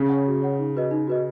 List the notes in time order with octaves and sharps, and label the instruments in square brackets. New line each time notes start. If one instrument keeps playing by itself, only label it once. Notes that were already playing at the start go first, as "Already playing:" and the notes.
Already playing: [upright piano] C#3
[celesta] C#5 F#5
F#4
C#5 F#5
D#4
F#4 B4 D#5
D#4
F#4 B4 D#5